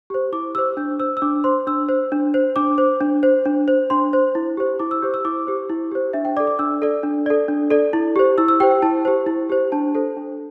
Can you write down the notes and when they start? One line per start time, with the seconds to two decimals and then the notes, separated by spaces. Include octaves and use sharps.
0.10 G4 C5
0.32 E4 D6
0.55 G4 E6
0.58 C5
0.77 D4 G6
1.00 C5 E6
1.17 E6
1.22 D4 D6
1.44 C5 C6
1.67 D4 E6
1.89 C5
2.12 D4
2.34 C5
2.56 D4 D6
2.78 C5
3.01 D4
3.23 C5
3.45 D4
3.68 C5
3.90 D4 C6
4.13 C5
4.35 E4
4.57 G4 C5
4.79 E4 D6
4.91 E6
5.02 G4 C5 G6
5.14 E6
5.25 E4 D6
5.47 G4 C5
5.70 E4
5.91 G4 C5
6.13 D4 E5
6.25 G5
6.37 D5 D6
6.40 A4
6.47 D6
6.59 D4 E6
6.82 A4 D5
7.03 D4
7.26 A4 D5
7.48 D4
7.70 A4 D5
7.93 E4
8.16 G4 C5
8.38 E4 E6
8.48 E6
8.60 G4 G5
8.63 C5
8.71 G5
8.82 E4 A5
9.05 G4 C5
9.27 E4
9.49 G4 C5
9.72 D4 A5
9.95 A4 C5
10.17 D4